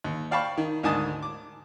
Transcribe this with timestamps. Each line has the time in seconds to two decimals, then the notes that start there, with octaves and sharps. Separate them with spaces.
0.04 D#2
0.31 D5 F5 G5 A5 B5 C#6
0.58 D#3
0.83 D2 G#2 D#3 G#5 A5 D#6
1.23 D6